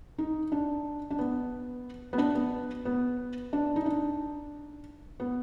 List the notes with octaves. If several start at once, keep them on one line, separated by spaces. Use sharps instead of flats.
D#4
D4
D4
B3
B3
D4
B3
B3
D4
D#4
D4
B3